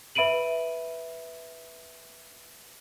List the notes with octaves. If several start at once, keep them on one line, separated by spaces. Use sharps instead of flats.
B4 E5 B5 D7 D#7 F#7